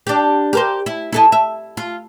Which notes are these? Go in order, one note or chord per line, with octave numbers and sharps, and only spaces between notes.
D4 G4
G4 A#4 C5
E4
E4 A4 D#5
E5
F4